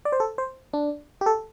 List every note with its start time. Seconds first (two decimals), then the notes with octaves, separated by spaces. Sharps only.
0.05 D5
0.12 C5
0.20 A4
0.38 C5
0.73 D4
1.21 G4
1.26 A4